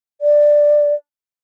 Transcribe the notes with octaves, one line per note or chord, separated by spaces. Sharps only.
D5